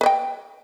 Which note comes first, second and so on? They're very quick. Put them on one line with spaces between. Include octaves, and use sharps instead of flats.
B4 D#5 G5